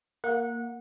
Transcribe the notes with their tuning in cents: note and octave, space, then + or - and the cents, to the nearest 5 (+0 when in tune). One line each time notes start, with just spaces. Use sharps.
A#3 +0 F#5 -20